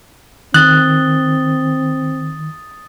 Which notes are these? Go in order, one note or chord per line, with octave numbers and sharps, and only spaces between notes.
D#3 C4 D#6 F#6 A6 G7